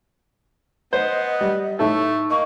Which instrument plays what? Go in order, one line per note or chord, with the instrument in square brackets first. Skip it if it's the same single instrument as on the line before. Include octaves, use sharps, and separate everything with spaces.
[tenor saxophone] B3 [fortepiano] C5 [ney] D#5
[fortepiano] G3
[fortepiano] A2 A4 [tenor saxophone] A3 [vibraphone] D#4 C#6
[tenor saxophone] A#3 [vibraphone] D#5 [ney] C#6